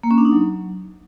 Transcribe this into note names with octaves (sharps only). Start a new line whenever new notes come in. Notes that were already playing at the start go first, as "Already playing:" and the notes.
A#3
C#4
D4
D#4
F#3